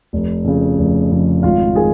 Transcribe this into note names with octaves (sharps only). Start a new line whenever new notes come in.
F1
F2 C#3
F1
F2 C#3
G#1 F4 F5
D#3 G#4 G#5